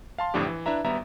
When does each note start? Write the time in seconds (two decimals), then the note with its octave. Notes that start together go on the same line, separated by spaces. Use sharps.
0.18 F5 A5 C6
0.34 G1 F2 A2 F3 D4 G4
0.47 E3
0.66 D4 E4 B4 E5 A#5
0.84 G#1 G3 B3 E5 A#5